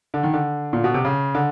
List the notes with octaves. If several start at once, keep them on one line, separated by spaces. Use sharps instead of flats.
D3
D#3
D3
A#2
B2
C3
C#3
D3